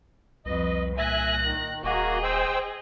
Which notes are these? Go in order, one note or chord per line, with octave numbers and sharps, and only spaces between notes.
C2 F2 B4 D#5
A#2 E5 G#5 F#6 A#6
D#3
D#1 A#3 F#4 G#4 D#5
C5 G5 E6